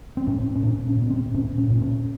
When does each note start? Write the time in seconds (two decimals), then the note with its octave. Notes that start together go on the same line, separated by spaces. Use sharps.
0.17 C4
0.27 A2 C#4
0.55 C#4
0.62 A#2 D4
0.87 C#4
0.98 A#2 B3
1.10 C4
1.34 A#2 C#4
1.58 C#4
1.70 A#2
1.78 C4
1.82 C#4